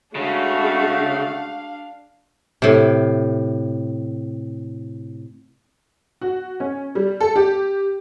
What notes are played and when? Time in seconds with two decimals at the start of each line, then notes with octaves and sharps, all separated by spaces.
0.15 C#3 G#3 A3 D4 F#4 F5
2.62 A2 C3
6.21 F#4
6.60 C#4
6.95 G3
7.20 A4
7.36 G4